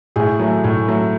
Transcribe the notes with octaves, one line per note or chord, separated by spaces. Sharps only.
A2 G#4
F#3 A3
A2
F#3 A3